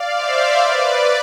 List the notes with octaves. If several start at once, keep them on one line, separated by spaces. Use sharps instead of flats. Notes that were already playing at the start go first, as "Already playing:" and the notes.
Already playing: D5 F5
C5 E5
B4 D5